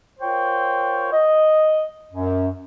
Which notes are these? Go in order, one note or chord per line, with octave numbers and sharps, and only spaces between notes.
F4 A#4 C5 C#5 G5
D#5
F#2